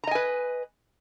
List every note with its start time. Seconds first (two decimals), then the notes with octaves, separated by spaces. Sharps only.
0.04 A#5
0.07 D#5
0.11 G#5
0.15 B4